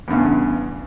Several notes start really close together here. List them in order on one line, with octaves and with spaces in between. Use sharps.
E2 G2 C#3